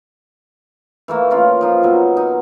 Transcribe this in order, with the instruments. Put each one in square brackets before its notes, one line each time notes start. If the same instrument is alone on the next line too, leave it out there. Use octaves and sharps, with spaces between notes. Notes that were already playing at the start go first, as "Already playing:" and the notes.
[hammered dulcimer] E3 A3 A#3
A#3 C#4 F4
F3 D#4
B2 F#3
D#4